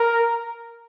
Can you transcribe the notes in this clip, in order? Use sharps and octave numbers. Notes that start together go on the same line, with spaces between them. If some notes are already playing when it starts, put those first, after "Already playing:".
Already playing: A#4